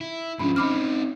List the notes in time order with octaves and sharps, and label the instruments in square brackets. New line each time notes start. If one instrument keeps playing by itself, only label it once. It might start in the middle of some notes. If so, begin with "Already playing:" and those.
[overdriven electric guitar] E4
[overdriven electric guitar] G#2 F3 [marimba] C#4 D4 B5
[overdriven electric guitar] C4 D#4 [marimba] B5 D6 F6